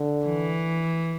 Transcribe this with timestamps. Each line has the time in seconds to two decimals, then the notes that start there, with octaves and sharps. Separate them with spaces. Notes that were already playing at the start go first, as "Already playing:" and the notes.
Already playing: D3
0.26 E3